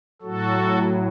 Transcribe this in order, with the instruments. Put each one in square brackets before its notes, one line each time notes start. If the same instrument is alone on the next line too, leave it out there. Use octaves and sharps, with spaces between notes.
[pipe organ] A2 F#3 F#4 A4